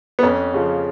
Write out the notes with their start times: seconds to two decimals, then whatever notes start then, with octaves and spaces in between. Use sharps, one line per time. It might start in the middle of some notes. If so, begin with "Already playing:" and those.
0.19 B3
0.23 F2 C#4
0.54 C#3 F3